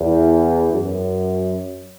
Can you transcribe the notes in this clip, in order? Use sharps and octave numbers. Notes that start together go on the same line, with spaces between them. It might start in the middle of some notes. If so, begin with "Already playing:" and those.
Already playing: E2
F#2